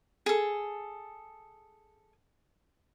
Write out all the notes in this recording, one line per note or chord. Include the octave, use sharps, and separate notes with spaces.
G#4 A4